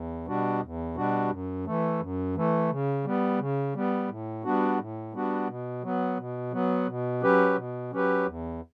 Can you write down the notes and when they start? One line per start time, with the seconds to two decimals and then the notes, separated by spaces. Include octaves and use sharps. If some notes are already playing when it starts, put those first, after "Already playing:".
Already playing: E2
0.27 B2 G3 D4 F#4
0.62 E2
0.95 B2 G3 D4 F#4
1.30 F#2
1.66 E3 A3
2.00 F#2
2.35 E3 A3
2.70 C#3
3.05 G3 B3
3.39 C#3
3.75 G3 B3
4.08 A2
4.44 G3 B3 D4 F#4
4.78 A2
5.13 G3 B3 D4 F#4
5.48 B2
5.83 F#3 B3
6.18 B2
6.52 F#3 B3
6.88 B2
7.22 F#3 C#4 G4 B4
7.56 B2
7.92 F#3 C#4 G4 B4
8.26 E2